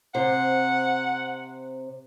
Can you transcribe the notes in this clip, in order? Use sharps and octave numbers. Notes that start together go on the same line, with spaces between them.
C3 C5 F#5